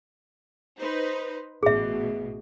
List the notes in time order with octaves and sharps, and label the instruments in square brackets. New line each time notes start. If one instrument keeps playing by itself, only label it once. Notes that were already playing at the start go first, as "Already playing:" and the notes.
[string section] D#4 B4 C5
[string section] A1 B2 [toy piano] G#4 E5